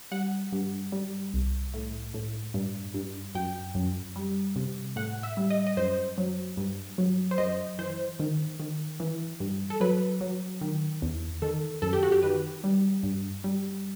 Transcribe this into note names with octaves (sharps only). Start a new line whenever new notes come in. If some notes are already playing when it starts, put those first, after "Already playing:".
G3 F#5
G2
G3
C2
A2
A2
G2
G2
F#2 G5
F#2
G3
C3
A2 F#5
E5
G3
D#5
D#5
F#2 C5
F#3
G2
F#3
C5
F#2 D#5
E3 C5
D#3
D#3
E3
G2
A4
F#3 B4
F#3
D#3
E2
D#3 A4
F#2 A4
G4
F#4
G4
D#3 B4
G3
G2
G3